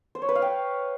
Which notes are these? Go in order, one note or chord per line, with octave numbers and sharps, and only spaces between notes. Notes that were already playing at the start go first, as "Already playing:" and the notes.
C5
C#5
B4
F5
G5